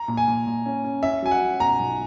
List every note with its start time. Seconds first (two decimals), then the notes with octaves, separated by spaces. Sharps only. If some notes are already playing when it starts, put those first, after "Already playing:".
Already playing: A#5
0.08 A#2
0.17 G#5
0.27 A#2
0.47 A#2
0.66 C#4
0.84 C#4
1.03 C#4 E5
1.22 F#3 G#5
1.31 F#5
1.41 C#4
1.60 B2 A#5
1.79 B1